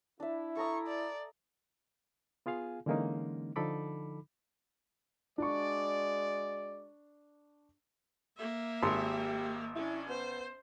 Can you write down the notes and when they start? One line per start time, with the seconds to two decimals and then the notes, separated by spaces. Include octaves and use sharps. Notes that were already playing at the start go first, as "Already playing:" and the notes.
0.20 D4 E4 E5
0.57 A4 A#5 C#6 D#6
0.87 D5
2.46 B3 F4 G#4 F5 G#5
2.86 D3 E3 G#3 A#3 C#4 D#4
3.56 D3 F3 D#4 A4 B5 D6
5.38 G#3 D4 F#4 D5 C#6
8.37 A#3 E5
8.83 G#1 G4 C6
9.76 C#4 D4 E4
10.09 B3 C5